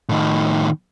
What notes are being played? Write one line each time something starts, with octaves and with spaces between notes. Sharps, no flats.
A2 D#3